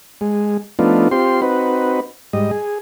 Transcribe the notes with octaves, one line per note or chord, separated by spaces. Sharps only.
G#3
F3 A3 B3 D4 D#4 F4
C4 F4 G4 C6
C4 D#4 F#4 B4
G#2 G3 D#5
G#4